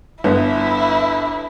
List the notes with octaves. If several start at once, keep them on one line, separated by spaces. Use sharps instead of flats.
G1 B3 E4